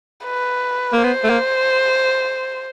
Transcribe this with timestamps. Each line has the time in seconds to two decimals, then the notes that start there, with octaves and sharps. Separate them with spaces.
0.25 B4
0.93 A#3
1.03 B3 C5
1.24 A3
1.30 A#3